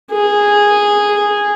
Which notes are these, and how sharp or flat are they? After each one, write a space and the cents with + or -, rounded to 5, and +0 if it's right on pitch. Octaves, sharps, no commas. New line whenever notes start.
G#4 -10